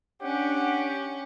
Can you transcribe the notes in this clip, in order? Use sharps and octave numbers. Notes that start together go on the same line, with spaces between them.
C#4 D4 G4 F#5